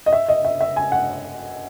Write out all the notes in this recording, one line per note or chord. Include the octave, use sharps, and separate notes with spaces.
D#5
E5
D#5
E5
E5
G#5
F#5